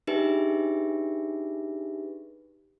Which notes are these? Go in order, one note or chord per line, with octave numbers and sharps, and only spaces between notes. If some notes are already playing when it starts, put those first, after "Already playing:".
D4 D#4 G4 G#4 B4 E5